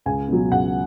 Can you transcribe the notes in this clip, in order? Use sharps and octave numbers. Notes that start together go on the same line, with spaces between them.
C#2 G#5
B2 F#3
C#2 F#5